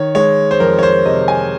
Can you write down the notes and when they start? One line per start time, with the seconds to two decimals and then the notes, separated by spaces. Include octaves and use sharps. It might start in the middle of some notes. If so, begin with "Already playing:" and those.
Already playing: D#3 C#5
0.15 G#3 C#5
0.51 C5
0.60 F2 A#4
0.79 C#5
0.83 C5
1.05 C3 D#5
1.28 G#5